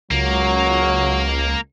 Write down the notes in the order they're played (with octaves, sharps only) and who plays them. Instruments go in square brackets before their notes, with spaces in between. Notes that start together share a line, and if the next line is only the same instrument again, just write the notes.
[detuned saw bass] C#2 [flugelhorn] F#3 [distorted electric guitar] A#3